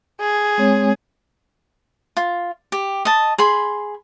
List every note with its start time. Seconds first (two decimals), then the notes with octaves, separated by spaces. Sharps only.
0.20 G#4
0.58 G#3 C4 C#5
2.17 F4
2.72 G4
3.05 D#5 A5
3.38 G#4 B5 C6